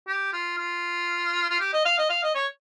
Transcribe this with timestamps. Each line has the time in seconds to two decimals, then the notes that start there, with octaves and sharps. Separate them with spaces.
0.08 G4
0.33 F4
0.58 F4
1.50 F4
1.60 G4
1.73 D#5
1.85 F5
1.98 D#5
2.10 F5
2.23 D#5
2.35 C#5